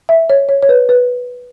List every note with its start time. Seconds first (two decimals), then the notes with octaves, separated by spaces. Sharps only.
0.09 E5
0.30 C#5
0.49 C#5
0.62 C#5
0.69 B4
0.89 B4